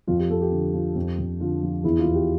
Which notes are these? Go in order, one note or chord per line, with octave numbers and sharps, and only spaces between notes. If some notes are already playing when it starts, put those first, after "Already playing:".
F2 F4
G4
F2 A4
G4
D3
F3
F2
F2
D3 F4
F3
E2 E4
F4
E2
G4